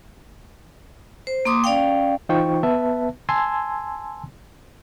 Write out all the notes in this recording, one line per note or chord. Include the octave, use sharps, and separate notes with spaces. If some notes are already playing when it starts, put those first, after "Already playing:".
C5
A#3 C6 D6 D#6
C#4 D5 F5 G5
E3 D#4 F4 C5 G5 C#6
B3 B4 E5 A5
G#5 A5 C6 E6 G#6